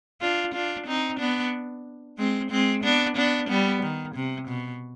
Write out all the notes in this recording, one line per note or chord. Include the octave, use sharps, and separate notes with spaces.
D4 F4
D4 F4
C4 D#4
B3 D4
G#3 C4
G#3 C4
B3 D4
B3 D4
G3 B3
D#3
C3
B2